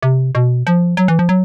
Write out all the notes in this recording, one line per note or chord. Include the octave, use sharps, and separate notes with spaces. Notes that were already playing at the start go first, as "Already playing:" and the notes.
C3
B2
F3
F#3
E3
F3
F#3